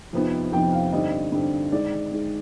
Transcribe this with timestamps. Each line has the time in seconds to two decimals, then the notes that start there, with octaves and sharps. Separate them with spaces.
0.13 F2 C3 F3 B3 D#4
0.52 F2 C3 F3 B3 D#4 G5
0.72 F5
0.92 G2 D3 G3 C4 D#4 D#5
1.32 G2 D3 G3 C4 D#4
1.72 G#2 D#3 G#3 D5
2.11 G#2 D#3 G#3